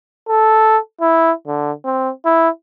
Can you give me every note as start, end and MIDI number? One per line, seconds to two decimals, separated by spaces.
0.28 0.78 69
1.01 1.31 64
1.47 1.72 50
1.85 2.09 60
2.25 2.49 64